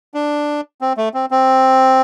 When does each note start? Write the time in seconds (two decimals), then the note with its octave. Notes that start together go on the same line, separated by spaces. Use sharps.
0.14 D4
0.81 C4
0.97 A3
1.14 C4
1.31 C4